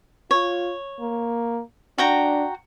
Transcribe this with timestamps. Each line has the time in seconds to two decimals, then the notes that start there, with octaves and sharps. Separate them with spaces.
0.31 F4 C#5
1.00 A#3
1.98 D4 F#4 G5 A#5